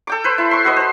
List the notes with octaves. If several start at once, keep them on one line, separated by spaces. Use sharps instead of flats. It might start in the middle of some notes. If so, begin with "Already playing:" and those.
A4 G5 D6
B4 C5
E4
C6 C#6
F#4 B4 D#5
C5 C6